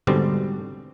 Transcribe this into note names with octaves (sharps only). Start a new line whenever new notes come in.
G#2 B2 D3 G3 C4